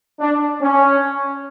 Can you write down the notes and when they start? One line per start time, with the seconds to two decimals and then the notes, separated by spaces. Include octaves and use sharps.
0.20 D4
0.62 C#4